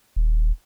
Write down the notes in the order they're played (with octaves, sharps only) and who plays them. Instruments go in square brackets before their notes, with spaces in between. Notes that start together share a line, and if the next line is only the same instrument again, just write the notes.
[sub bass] D#1